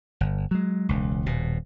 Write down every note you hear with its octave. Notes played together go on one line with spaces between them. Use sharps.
G1
F#3 G#3
E1 C#2
D#1 B2